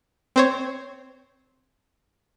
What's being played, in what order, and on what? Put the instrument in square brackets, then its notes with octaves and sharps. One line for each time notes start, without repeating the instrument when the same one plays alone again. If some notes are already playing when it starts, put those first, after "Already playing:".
[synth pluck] C4 C5 C#5